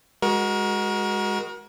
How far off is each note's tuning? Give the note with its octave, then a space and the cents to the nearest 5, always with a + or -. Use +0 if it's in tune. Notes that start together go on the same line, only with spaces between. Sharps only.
G#3 -10 F#4 +0 A#4 +30